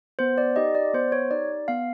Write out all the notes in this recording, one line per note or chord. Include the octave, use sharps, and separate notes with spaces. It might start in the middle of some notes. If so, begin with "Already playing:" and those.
B3 C5
D5
D#4 G4 D#5
D5
B3 C5
C#5
D#4 G4 D5
B3 F5